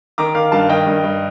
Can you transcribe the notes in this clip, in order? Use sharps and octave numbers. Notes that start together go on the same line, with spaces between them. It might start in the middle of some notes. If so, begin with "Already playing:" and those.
D#3 A#5 D6
D#3 F5
G2 F5 A5
D#3 D#5 G5
G2
G2